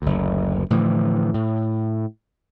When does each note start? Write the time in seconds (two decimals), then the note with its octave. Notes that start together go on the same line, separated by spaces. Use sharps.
0.02 F#1 D2
0.70 A2 D3 E3 F3
1.34 A2